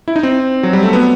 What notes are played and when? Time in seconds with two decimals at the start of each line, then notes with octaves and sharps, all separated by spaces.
0.08 E4
0.16 D#4
0.23 C4
0.63 F#3
0.73 G3
0.83 A3
0.93 B3